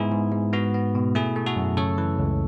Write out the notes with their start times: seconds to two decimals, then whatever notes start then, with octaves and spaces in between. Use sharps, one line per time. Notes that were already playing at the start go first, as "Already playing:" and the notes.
Already playing: G#2 B3 E4 G#4
0.12 G#2
0.32 G#2
0.53 B3 F#4
0.74 B3
0.95 B2
1.15 A3 E4 G#4
1.36 A3
1.46 F#4 A4
1.56 F#2
1.77 C#3 A4 C#5
1.98 E3
2.19 C#2